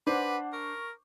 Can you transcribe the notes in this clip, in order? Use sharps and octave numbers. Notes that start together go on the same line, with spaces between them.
D4 B4 C5 F#5 D6
A#4 C#6